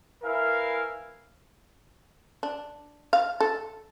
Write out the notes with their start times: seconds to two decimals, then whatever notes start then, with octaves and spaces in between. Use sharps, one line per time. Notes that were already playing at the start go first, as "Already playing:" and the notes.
0.23 E4 A#4 B4 E5 F5 G#5
2.43 D4
3.13 F5
3.40 A4